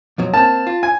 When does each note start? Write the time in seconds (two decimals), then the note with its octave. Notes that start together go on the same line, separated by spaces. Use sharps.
0.18 F2 B2 F#3
0.34 A#3 C4 A5
0.67 F4
0.83 G#5